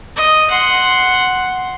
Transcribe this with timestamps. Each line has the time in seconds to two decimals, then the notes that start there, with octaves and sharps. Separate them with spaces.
0.16 D#5
0.51 F#5 C6